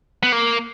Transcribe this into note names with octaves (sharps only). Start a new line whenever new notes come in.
B3
A#3